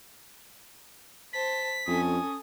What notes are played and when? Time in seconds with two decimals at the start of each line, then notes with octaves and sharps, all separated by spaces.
1.33 C5 A5 B6
1.87 F2 C#4 A4 G#5 D#6